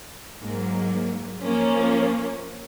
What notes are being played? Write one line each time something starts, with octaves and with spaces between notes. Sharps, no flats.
G#2 F#3 A#3
F3 A#3 C#4